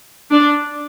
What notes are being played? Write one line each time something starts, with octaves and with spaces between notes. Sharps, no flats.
D4